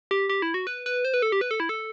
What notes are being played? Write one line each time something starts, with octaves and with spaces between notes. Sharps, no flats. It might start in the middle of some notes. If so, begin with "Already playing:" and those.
G4
G4
E4
F#4
B4
B4
C5
B4
A4
G4
B4
A4
E4
A4